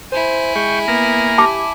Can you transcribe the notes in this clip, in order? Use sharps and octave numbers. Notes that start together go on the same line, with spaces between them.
E4 C5 G#5
G#3 G5 C#6
A#3 B3 A#5
G4 A5 D6